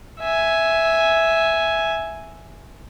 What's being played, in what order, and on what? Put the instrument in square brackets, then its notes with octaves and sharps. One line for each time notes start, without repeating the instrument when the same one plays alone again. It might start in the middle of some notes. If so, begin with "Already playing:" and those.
[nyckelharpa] E5 G#5